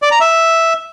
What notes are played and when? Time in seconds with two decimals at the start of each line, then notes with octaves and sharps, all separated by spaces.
0.02 D5
0.11 A#5
0.21 E5